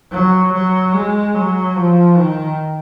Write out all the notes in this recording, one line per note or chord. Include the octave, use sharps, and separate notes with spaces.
F#3
F#3
G#3
F#3
F3
D#3